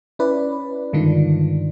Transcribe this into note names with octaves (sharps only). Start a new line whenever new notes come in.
C#4 E4 B4 D5
G2 D3 D#3 G#3 D4 F4